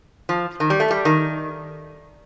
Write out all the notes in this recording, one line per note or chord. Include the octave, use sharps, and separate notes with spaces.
F3
D#3
G3
A3
G3
D#3